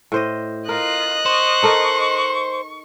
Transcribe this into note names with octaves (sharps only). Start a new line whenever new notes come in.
A2 C5 D#5
F4 A#4 D#5 F#6
C5 C#6
D#4 A4 A#4